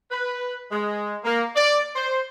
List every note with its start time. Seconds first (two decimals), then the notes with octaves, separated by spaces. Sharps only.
0.11 B4
0.71 G#3
1.24 A#3
1.55 D5
1.95 C5